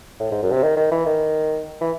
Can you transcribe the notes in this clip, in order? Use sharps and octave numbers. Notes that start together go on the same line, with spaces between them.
A2
G#2
F#2
C3
D#3
D#3
E3
D#3
E3